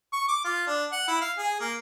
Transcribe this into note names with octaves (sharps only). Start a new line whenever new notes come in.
C#6
D6
F4
D4
F#5
E4
F5
G#4
A#3